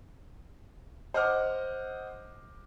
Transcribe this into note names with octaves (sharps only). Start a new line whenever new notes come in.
C5 D#5 F#5 D6 F6